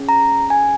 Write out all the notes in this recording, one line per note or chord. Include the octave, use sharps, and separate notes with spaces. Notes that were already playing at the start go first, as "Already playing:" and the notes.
Already playing: C#4 G#4
A#5
G#5